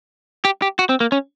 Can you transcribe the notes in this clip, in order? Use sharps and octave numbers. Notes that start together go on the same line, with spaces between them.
G4
G4
F#4
C4
A#3
C#4